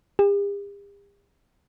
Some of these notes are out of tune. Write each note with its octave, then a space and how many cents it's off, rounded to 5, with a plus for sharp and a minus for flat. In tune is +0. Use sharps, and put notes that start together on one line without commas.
G4 +45